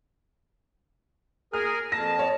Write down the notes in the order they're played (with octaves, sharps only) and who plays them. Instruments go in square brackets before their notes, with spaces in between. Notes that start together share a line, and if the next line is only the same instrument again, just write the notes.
[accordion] G#4 A#4 G#5 [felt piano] F6
[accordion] F2 A5 [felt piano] A#6
[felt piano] C#5